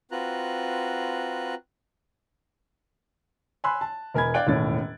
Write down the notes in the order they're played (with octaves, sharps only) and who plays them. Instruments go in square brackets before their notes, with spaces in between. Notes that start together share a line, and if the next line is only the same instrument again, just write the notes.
[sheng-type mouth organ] C4 F4 F#4 B4 A#5 F#6
[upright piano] G#5 B5 C6 E6 F#6
A5
E1 A#4 G#5 B5 G#6
D5 F5 G5 F#6 D7
E1 D#2 A2 C#4 A6